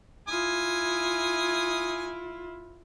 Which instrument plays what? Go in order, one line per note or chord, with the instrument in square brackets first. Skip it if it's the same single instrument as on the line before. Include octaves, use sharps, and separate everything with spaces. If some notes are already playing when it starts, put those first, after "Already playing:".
[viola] E4 F4 [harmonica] G#5 D#6